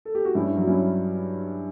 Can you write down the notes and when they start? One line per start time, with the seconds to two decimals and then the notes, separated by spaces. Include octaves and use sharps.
0.05 A4
0.15 G4
0.25 F#4
0.35 G2 C#4 E4
0.56 F#3
0.66 C#4 E4